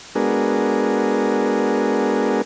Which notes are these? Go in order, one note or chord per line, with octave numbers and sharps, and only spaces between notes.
G#3 B3 D4 F#4 G#4 A#4